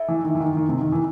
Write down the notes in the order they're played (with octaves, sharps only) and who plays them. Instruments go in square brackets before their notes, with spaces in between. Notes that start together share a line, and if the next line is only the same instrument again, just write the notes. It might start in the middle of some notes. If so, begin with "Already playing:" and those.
Already playing: [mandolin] E4 A4 D#5
[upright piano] E3
D#3
E3
D#3
D#3
C3
D#3
E3